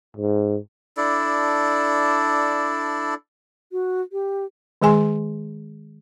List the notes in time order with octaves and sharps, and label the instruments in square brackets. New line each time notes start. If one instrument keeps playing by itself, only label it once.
[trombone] G#2
[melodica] D4 E4 A4 D5
[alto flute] F#4
G4
[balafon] D#3 G#3 G#4 G#5 C6